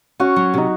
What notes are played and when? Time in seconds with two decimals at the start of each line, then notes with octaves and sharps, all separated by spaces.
0.20 C#4 F#4
0.36 F#3
0.54 C3 D#4